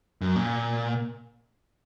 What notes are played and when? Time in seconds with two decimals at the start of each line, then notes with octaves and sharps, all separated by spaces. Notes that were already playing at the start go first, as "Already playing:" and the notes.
0.21 F#2
0.36 A#2